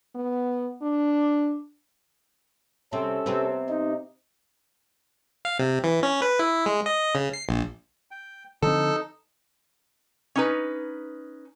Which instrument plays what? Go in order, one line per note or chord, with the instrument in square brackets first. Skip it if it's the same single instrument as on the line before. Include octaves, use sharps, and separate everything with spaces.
[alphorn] B3
D4
[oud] C3 C4 [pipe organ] C#4 A4
[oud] C3 B3 C4
[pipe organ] D#4
[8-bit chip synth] F5
C3
E3
C#4
B4
E4
G#3
D#5
C#3
C7
A#1
[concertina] G5
[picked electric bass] D3 F3 C4 [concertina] D#4 [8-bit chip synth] A4
[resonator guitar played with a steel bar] C#4 D#4 B4